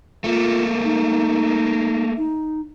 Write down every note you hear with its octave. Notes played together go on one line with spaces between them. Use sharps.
A3 A#3 F4
D#4
D#4